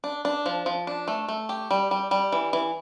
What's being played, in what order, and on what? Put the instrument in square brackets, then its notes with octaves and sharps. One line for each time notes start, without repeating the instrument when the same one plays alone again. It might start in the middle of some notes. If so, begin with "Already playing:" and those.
[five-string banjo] D4
D4
F3
F3
D4
A3
A3
G4
G3
G3
G3
E3
E3